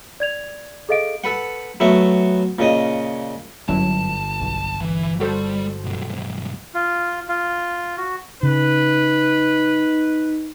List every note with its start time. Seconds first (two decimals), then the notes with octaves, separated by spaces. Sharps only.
0.20 D5 G#6 F7
0.89 G#4 A4 D#5 F5 D7
1.24 A4 B4 F#5
1.80 F#3 A3 B3 F#4 E5
2.59 A#2 C#3 D#5 D#6
3.69 G1 F#2 F#3 E4 A5
4.41 B1
4.81 E3
5.20 G3 F#4 A4 C5
5.85 B1 G2
6.74 F4
7.29 F4
7.97 F#4
8.43 C#3 D#4 B4